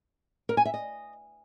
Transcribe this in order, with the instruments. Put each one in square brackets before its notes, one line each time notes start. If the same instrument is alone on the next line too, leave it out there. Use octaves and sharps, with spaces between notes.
[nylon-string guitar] A#4
G#5
E5
D#5